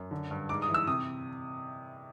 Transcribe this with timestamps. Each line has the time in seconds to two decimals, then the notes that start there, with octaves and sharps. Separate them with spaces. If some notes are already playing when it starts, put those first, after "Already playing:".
Already playing: F#2
0.11 D3
0.31 G2
0.49 G#2 D6
0.62 D#6
0.69 E3
0.74 E6
0.87 C3 D#6